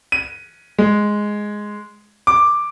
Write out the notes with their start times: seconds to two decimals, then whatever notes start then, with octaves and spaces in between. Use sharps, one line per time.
0.12 D#7
0.78 G#3
2.27 D6